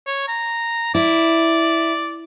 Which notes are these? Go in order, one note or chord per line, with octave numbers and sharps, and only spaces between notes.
C#5
A#5
E4 D5